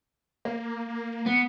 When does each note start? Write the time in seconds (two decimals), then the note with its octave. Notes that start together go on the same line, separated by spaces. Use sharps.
0.45 A#3
1.26 B3